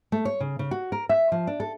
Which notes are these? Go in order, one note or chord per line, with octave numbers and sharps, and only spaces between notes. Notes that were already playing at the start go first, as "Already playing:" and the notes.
A3
C#5
C#3
C#3
F#4
A#4
E5
F3
D4
A4